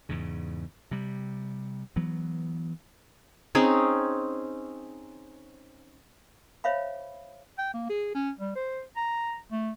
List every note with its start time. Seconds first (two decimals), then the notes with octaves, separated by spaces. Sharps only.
0.09 E2 G#2 C#3
0.91 C3 G3
1.96 E3 F#3 B3
3.55 C4 C#4 D#4 G#4
6.64 C5 C#5 E5 F5 B5
7.58 G5
7.74 A#3
7.89 G#4
8.14 C#4
8.39 G3
8.56 C5
8.97 A#5
9.51 A3